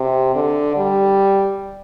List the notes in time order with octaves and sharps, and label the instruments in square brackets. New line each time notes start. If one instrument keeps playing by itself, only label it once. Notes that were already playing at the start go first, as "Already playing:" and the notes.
Already playing: [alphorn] C3
D3
G3